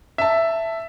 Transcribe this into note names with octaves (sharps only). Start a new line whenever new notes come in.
E5 A5